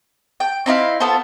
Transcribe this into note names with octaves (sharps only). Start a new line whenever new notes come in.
G5
C4 D#4 E4 F5
B3 F4 A4 C5